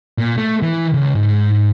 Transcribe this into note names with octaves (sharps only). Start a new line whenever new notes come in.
A#2
A3
E3
C#2
G#2